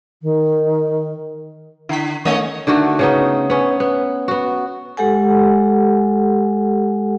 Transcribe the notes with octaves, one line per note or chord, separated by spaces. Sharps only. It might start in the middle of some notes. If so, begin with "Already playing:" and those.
D#3
D3 E4 B6
D#3 A3 A#3 C#4 C#5 D#5
D3 D#3 A3 F#4
C#3 B3 D#4
B3 C#4
B3
B3 F#4
G#3 G4 A4 F#5 G#5